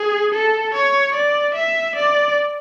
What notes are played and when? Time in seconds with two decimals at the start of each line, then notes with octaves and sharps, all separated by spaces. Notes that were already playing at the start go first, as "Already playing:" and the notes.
Already playing: G#4
0.34 A4
0.74 C#5
1.14 D5
1.55 E5
1.95 D5